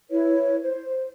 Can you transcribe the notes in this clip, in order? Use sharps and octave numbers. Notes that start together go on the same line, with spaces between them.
E4 B4 C#5
C5